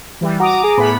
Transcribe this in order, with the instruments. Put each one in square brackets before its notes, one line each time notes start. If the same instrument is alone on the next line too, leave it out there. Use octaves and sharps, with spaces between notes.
[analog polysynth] E3 G3
[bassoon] F#4 [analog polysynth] A#5 D6 D#6
[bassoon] G#4
[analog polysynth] A2 B3 B5